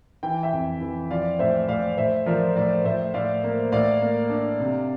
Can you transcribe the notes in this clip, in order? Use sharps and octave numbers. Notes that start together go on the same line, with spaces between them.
E3 G5
E5 G5
F2
E3
F3 D5 F5
A2 C5 E5
A2 D5 F5
A2 C5 E5
F3 A#4 D5
A2 A#4 D5
A2 C5 E5
A2 D5 F5
A#3
A2 D5 F5
A#3
D4
C3